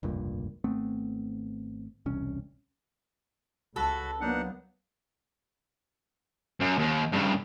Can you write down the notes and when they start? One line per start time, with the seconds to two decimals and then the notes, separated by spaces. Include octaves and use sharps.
0.03 F1 C#2 G2 A#2
0.64 G#1 A3 B3 C4
2.06 E1 C2 C#4
3.76 C#2 F#4 A4 B5
4.21 F#3 A#3 B3 D4 D#4 F#5
6.60 F#2
6.78 D#2
7.12 G2 C#3